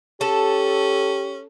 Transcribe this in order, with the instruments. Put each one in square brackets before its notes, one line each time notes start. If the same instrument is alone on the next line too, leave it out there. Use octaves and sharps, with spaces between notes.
[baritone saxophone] C#4 [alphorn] G4 [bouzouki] A4